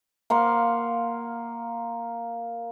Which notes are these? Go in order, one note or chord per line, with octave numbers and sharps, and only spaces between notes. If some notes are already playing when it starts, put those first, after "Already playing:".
A#3 F5 F#5 C6